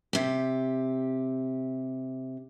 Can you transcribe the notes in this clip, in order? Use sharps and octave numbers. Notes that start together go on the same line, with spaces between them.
C3 G4